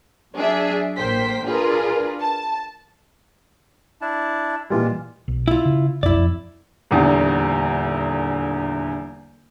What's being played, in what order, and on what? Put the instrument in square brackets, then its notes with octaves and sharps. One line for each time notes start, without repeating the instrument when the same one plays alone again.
[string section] F#3 D4 G#4 E5
A1 A#3 C5 G5 B6
D4 F4 G#4 A#4 B4
A5
[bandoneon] D4 E4 A5
[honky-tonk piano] A#2 E3 G3 [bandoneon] G#3 F4
[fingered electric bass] B1
[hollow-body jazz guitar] E4 F4
[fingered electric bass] C#3
[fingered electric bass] F1 B1 F#2 [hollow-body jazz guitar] E4 D5
[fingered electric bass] F2
[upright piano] D#1 E2 D3